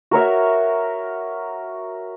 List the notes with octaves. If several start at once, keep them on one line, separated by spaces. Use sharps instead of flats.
F#4 A#4 C#5 E5